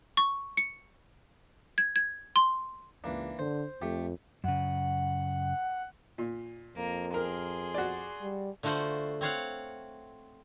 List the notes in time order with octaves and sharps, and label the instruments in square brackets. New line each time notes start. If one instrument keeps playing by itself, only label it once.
[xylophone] C#6
C#7
G#6
G#6
C6
[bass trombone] C#2 [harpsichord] E3 A#3 D4
[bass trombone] D3 [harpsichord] C5
[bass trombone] F2 [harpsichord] A3 G4
[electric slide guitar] F#2 C#3 [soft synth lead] F#5
[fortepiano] A#2
[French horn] F2 [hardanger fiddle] A#3
[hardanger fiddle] G#4 C6 [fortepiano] A#4
[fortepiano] F#4 D5
[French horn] G3
[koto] D3 A3 F4 F#4 C5 F#5
C4 C#5 F5 F#5